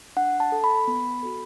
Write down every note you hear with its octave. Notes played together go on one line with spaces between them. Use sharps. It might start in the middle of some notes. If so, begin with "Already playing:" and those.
D4 F#5
A5
A4
B5
B3
F#4 A4